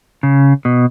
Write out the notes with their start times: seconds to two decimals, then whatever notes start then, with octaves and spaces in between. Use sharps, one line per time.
0.23 C#3
0.65 B2